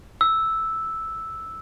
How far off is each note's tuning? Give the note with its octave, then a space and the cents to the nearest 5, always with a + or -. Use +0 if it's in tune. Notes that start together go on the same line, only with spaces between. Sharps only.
E6 -5